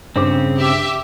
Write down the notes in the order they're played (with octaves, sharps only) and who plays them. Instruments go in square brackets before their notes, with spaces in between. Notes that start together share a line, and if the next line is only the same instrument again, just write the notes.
[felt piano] G2 C5 D6 [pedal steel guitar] C#3 C4
[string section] G4 E5